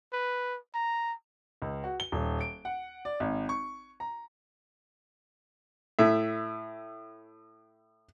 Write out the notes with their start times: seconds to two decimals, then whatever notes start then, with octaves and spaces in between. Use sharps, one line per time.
0.13 B4
0.74 A#5
1.62 C#2
1.84 F#4
2.00 G7
2.12 D#1
2.41 D7
2.65 F#5
3.05 D5
3.20 G#1
3.49 C#6
4.00 A#5
5.99 A2 E5